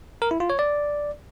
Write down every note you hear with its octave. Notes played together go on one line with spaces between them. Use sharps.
A#4
E4
F4
C#5
D5